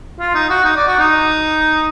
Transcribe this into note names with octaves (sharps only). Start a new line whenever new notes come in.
F4
D#4
F#4
D#4
D5
F#4
D#4